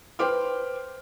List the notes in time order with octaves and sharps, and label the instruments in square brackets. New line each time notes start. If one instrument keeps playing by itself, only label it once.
[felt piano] B4 C5 G5 C6 D6 F6